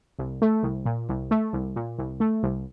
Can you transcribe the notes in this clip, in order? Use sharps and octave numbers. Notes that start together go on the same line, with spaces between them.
C2
A3
C2
A#2
C2
A3
C2
A#2
C2
A3
C2